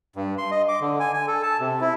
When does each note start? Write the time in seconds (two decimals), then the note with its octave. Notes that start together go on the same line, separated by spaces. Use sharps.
0.16 G2
0.38 C6
0.51 D#5
0.68 D6
0.81 D3
1.00 G#5
1.13 G#5
1.28 A4
1.43 A5
1.60 C3
1.81 E4